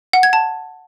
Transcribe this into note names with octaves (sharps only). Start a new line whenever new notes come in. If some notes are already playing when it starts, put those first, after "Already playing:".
F#5
G#6
A5